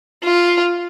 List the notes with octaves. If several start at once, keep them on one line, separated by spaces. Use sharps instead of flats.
F4